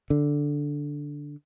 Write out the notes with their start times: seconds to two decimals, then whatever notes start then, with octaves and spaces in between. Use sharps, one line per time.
0.10 D3